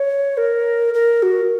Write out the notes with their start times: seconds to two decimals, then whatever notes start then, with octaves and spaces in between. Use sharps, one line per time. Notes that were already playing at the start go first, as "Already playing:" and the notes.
Already playing: C#5
0.37 A#4
0.94 A#4
1.23 F#4